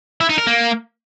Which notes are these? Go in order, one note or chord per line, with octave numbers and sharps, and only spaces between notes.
E4
D#4
A#4
A#3